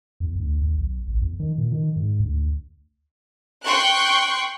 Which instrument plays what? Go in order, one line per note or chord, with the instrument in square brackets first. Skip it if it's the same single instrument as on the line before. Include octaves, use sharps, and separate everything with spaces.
[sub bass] E2
D2
D#2
B1
A1
E2
D#3
A#2
D#3
G#2
D2
[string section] G5 C6 C#6 F#6